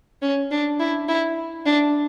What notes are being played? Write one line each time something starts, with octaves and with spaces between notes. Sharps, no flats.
C#4
D4
E4
E4
D4